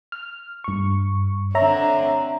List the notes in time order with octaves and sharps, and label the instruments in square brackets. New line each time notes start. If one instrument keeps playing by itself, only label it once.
[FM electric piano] F6
G2 C#6
[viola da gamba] D3 C4 D4 [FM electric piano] C#5 E5 A#5